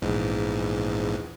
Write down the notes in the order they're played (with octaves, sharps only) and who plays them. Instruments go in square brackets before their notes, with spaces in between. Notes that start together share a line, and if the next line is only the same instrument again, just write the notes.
[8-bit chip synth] A#1 E2 G#2